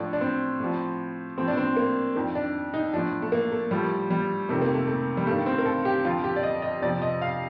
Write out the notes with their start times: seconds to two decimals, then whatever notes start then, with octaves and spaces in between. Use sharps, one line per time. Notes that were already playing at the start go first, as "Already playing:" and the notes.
Already playing: A2 F3 D4
0.13 D4
0.21 C4
0.60 A2 F3
1.38 A2 F3 C4
1.48 D4
1.57 C4
1.76 A#3
2.15 F2 D#3
2.35 D4
2.74 D#4
2.93 A2 F3 D4
3.22 A3
3.32 A#3
3.52 A3
3.71 A2 F3 G3
4.10 G3
4.49 F2 C3 D#3 A3
4.62 A#3
4.74 A3
4.88 A3
5.17 G3
5.27 G2 D#3 A3
5.46 C4
5.58 A#4
5.66 A4
5.85 G4
6.05 F2 D3 F3 F4
6.24 G4
6.36 D5
6.43 D#5
6.62 D#5
6.82 F2 C3 F3 D5
7.02 D#5
7.22 F5